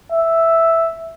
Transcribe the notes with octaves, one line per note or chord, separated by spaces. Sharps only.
E5